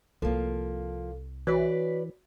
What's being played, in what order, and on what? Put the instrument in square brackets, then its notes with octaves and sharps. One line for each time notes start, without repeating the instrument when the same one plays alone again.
[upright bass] C2 E4 [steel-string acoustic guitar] F3 A#3 [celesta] A4
[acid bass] E3 [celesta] F#4 C#5 B6 [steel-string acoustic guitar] B4 D5